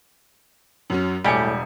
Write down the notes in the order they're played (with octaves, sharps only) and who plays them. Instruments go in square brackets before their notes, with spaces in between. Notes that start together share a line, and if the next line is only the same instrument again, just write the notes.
[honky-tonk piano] F#2 F#3 C#4
[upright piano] E1 G#5 C#7 [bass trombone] A2 [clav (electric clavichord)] G3 G4 [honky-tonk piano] D6